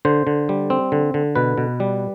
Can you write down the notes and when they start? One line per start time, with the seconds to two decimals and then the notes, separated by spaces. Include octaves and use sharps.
0.05 D3 C5
0.27 D3
0.49 G3
0.70 C4
0.92 D3
1.14 D3
1.36 B2 B4
1.58 B2
1.80 G3